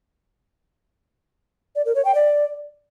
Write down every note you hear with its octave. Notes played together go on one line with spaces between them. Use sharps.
D5
A#4
C#5
G5
D5